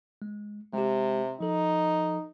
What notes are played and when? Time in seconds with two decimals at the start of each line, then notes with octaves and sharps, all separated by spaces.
0.22 G#3
0.74 C3 G#3 G4
1.41 F3 D#4 A4